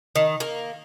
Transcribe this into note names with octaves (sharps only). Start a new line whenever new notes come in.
D#3
A#3